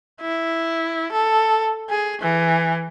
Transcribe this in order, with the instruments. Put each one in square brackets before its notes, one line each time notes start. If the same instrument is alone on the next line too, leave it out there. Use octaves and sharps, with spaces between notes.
[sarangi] E4
A4
G#4
E3